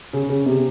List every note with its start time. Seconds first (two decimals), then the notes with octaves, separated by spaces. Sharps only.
0.13 C#3
0.29 C#3
0.46 C3